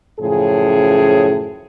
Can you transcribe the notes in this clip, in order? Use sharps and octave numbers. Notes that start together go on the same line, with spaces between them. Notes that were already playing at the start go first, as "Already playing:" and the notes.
F#2 A2 C#3 F3 G#4